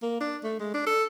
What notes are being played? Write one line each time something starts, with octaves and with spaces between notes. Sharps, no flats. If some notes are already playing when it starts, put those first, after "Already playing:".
A#3
D4
A3
G#3
D4
A4